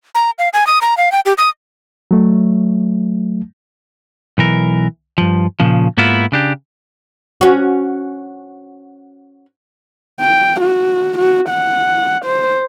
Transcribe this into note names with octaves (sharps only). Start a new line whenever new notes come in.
A#5
F5
G#5
D#6
A#5
F5
G5
G4
D#6
F#3 A3
B1 E3 A#4
G2 F3
A#2 C#3 F3
G#2 A#3 B3 E4 F4
C#3 D4 G4
C#4 F#4
G5
F#4
F#4
F#5
C5